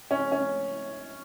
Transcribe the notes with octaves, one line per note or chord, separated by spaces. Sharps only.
C#4
C#4